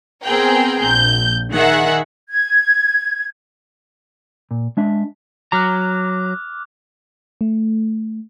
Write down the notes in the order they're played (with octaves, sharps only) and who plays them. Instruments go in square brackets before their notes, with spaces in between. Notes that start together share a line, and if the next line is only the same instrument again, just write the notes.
[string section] B3 C4 G#4 A#4 G5
A#1 G6
D#3 G#4 E5 F#5
[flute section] G#6
[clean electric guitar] A#2
G#3 D4 E5
[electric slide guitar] F#3 A#5 [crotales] D6 F6 F#6
[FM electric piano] A3